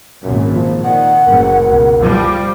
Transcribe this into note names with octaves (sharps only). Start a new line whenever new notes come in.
G#1 F#2 A#2
F3
A#2 D#3 F#5
F#1 A2 A#4
C#2 B2
F3 G3